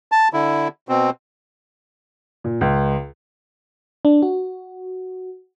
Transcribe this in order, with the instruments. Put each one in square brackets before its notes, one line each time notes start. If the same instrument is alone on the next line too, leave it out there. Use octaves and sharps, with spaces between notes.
[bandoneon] A5
D3 E4
B2 C4
[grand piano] A#2
C#2
[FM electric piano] D4
F#4